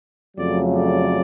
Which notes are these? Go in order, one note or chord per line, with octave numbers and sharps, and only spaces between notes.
F2 C#3 F#3 A3 D5
D5